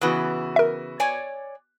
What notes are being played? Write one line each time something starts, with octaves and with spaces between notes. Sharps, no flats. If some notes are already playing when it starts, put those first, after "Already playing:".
C#3 E3 B3 F#4 B4
A#4 E5
C#5 D5 G#5